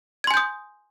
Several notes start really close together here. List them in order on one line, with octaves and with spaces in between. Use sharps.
G#6 C6 G#5 G6 D#6